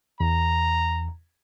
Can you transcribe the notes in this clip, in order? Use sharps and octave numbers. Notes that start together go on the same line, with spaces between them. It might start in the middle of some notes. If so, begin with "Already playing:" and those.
E2 A#5